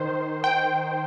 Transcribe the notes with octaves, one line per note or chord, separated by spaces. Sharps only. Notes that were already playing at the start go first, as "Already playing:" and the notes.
Already playing: D#3 C5
G5